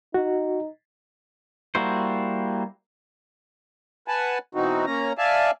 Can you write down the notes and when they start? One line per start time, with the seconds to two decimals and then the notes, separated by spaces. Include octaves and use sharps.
0.14 D#4 F#4
1.75 G3 A#3 E4 F#4 C5
4.08 B4 F#5 G#5 A5
4.55 B2 E3 C4 D#4 F#4
4.86 A#3 C#4 A#5
5.18 D5 E5 F5 G#5 A5